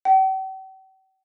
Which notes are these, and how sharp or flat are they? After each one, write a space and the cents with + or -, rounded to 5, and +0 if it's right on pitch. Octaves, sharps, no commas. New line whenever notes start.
G5 -45